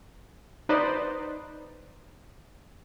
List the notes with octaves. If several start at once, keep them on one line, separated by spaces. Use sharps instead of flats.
D#4 B4 C5 D5 D#5